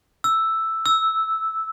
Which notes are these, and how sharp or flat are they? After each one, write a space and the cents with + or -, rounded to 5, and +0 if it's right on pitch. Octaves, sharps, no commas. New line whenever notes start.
E6 +0
E6 -10